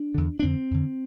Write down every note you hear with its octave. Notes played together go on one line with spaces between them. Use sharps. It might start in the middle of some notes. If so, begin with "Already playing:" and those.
Already playing: D4
E2 D3
D4
F2 D3 C4
F2 D3